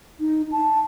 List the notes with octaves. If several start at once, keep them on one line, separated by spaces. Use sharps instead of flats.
D#4
A5